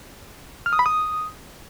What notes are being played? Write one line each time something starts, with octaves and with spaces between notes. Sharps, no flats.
F6
D#6
B5
D#6